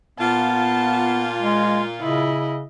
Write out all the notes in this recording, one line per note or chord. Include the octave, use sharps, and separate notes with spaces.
A#2 B3 F4 A5
G#3
C#3 E4 D#5